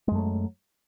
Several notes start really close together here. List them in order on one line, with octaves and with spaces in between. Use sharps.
G#3 F#2 A3 F#3